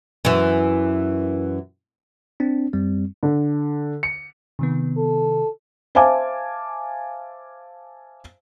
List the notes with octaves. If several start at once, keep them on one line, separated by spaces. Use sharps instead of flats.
F#2 E3
C4 D4
F#2 G3 C4
D3
C#7
C3 D#3 B3
A4
C5 E5 F5 G#5 A5 D6